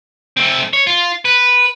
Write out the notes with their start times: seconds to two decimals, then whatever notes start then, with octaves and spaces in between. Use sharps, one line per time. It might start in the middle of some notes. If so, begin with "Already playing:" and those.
0.37 A3 C4
0.73 C#5
0.87 F4
1.25 B4